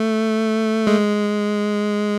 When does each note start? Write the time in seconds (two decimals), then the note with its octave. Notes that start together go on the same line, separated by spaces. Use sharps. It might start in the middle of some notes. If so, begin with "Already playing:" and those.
Already playing: A3
0.87 G#3